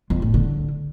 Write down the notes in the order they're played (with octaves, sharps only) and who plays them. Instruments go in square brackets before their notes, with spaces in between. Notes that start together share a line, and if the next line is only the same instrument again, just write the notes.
[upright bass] F2
A2
D3